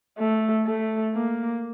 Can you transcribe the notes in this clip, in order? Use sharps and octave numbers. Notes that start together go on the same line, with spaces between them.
A3
A3
A#3